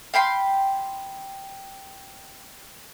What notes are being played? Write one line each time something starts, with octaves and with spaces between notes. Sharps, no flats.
F5 G5 B5 C6